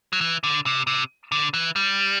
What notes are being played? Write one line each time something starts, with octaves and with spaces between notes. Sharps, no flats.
F#3
E3
D3
C3
C3
D3
E3
G3